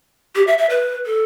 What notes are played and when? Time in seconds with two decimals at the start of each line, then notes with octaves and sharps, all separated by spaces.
0.35 G4
0.47 E5
0.58 E5
0.70 B4
1.06 A4